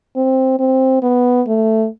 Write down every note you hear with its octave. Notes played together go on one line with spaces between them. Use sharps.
C4
C4
B3
A3